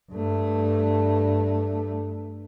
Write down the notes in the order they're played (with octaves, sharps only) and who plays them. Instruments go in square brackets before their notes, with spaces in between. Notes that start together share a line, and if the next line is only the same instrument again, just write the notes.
[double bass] G2 A3